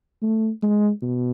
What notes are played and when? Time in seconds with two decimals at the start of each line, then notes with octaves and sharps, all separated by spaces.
0.22 A3
0.63 G#3
1.02 B2